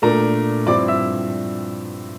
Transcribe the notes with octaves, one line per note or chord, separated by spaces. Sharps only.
A#2 A3 D4 A#4 A#5
G2 F3 C4 E4 D5 D6
E5 E6